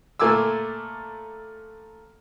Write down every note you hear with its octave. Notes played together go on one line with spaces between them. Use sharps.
A#2 A3 G#5 D6 E6